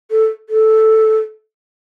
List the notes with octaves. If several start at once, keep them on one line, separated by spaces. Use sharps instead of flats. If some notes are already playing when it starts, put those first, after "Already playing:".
A4
A4